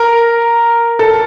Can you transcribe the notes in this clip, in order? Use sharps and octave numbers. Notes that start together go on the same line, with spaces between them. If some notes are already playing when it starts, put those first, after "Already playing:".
Already playing: A#4
A4